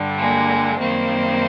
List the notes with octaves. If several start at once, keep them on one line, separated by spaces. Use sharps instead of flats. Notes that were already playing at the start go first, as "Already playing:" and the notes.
Already playing: G2 D3 G3
G#3 A#3
F#2 D#3 G3 A#3 C4